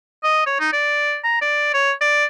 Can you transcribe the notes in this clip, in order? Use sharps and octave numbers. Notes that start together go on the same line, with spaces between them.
D#5
C#5
D#4
D5
A#5
D5
C#5
D5